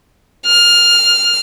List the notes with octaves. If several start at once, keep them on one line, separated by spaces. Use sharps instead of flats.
F6